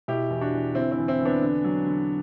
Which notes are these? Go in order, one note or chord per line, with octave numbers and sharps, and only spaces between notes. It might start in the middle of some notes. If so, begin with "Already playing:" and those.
B2 E4 G4
E2
D4 F#4
E2
D3 C4 E4
C4 E4
E2
C4 E4
E2
B3 D4
D3
F#3
D3